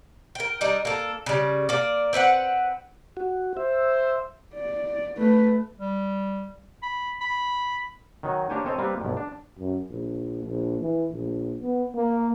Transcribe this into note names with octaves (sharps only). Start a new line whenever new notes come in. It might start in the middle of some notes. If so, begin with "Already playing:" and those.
A#4 G5
G3 D4 D#4
A#3 A4
C#3 G3
A#3 D5
C4 B4 E5 F#5
F#4
C5 E5
D5
A3 B4
G3
B5
B5
D#3 F#3 D#4
A#3 D4 G4 C5 C#5 G#5
C4 A4 C5 C#5 D#5
G3 A#3 C4 G4 B4
B1 G2
D4
F#2
A#1
A#1
E3
A#1
B3
A#3